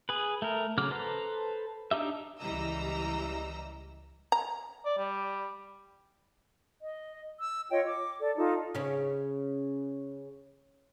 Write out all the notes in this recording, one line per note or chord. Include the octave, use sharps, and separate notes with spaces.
G#4 B4
A3 A#4
C#3 F#3 D6 F6
A4 B4 C5 A#5
D4 D#4 G4 E5
C#2 E3 G3 D#5 A#5 E6
A#5
D5
G3
D#5
E6
F4 C#5 D#5 G5
D6
A4 D5
D#4 F4 A4
C#3 C#4